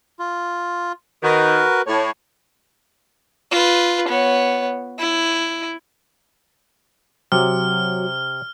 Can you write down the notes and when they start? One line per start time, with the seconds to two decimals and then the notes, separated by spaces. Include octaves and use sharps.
0.19 F4
1.23 D#3 F#4 A#4 B4
1.87 A2 C#5
3.51 F4 B4
4.08 B3 C#5
4.98 E4
7.32 C3 F#3 F6